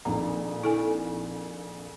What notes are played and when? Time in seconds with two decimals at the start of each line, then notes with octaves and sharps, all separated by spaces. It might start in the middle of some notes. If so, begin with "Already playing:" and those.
0.05 A#1 F2 D#3 A#5
0.63 E4 A4 G#5